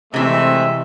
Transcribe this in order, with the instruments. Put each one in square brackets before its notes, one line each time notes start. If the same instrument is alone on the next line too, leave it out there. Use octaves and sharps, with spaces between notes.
[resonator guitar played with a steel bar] C3 E3 [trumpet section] G#3 A3 C4 [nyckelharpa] E5